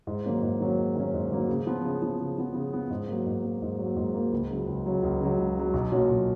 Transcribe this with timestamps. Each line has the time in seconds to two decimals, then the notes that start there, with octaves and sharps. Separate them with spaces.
0.07 G#2
0.25 D#3 F#3 A#3 C#4
0.43 G#2
0.60 D#3 F#3 A#3 C#4
0.78 G#2
0.95 D#3 F#3 A#3 C#4
1.14 G#2
1.30 D#3 F#3 A#3 C#4
1.48 C#3
1.67 F3 B3
1.85 C#3
2.02 F3 B3
2.20 C#3
2.38 F3 B3
2.55 C#3
2.73 F3 B3
2.91 G#2
3.08 F#3 A#3
3.27 G#2
3.44 F#3 A#3
3.62 G#2
3.79 F#3 A#3
3.96 G#2
4.14 F#3 A#3
4.32 C#2
4.50 C#3 F#3
4.67 C#2
4.86 C#3 F#3
5.03 C#2
5.21 C#3 F#3
5.38 C#2
5.56 C#3 F#3
5.74 B1
5.92 A#2 F#3 C#4 F#4
6.10 B1